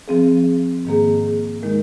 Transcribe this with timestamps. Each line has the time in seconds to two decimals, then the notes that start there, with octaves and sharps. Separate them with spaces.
0.08 F3 C4 G#4
0.85 G#2 D#3 A#3 G#4
1.62 D#3 G#3 D#4 A#4